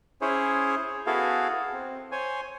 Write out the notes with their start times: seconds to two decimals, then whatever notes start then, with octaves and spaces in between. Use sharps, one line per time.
0.21 C#4 E4 G#4 C5 C#5
1.06 B3 E4 F#4 G#4 A4 F5
1.73 C4
2.12 C5 C#5 G#5